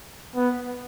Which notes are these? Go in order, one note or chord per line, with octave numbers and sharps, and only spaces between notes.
B3